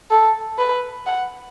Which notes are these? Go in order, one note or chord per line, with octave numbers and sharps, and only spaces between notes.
A4
B4
F#5